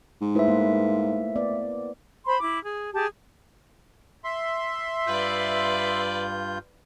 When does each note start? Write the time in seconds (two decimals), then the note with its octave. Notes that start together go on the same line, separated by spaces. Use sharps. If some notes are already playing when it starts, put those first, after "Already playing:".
0.21 G#2
0.35 A3 E4 B4 C5 E5
0.48 A#3
1.36 B3 D5
2.25 C5 B5 C6
2.39 E4 D6
2.63 G#4
2.94 G4 G#4 A5
4.24 E5 C6
5.07 G2 F4 B4 D5 G6